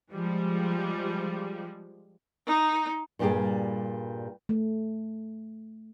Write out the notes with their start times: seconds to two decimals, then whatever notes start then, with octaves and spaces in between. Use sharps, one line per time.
0.12 F3 G3 G#3
2.47 D#4
3.19 G2 A#2 G3 G4 G#4 D5
4.49 A3